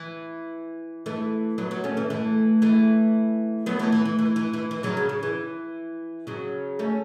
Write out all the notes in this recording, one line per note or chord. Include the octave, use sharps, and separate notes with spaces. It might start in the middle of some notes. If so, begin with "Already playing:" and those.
Already playing: E3
E3 A3
F#3 B3
F#3 B3
A3 C#4
E3 A3
E3 A3
E3 A3
F#3 B3
E3 A3
E3
E3
E3
E3
E3
E3
C#3 F#3
C#3
C#3
E3
C#3 F#3
A3 C#4